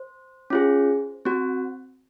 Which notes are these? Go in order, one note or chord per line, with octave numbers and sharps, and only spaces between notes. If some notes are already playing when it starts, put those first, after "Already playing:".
Already playing: C5
C#4 F4 G#4
C4 F#4